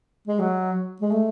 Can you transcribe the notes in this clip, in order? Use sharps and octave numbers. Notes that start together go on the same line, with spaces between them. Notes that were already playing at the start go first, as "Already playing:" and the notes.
G#3
F#3
G#3
A3